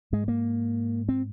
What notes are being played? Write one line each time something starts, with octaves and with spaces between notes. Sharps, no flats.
G#2 G#3
A#3
C4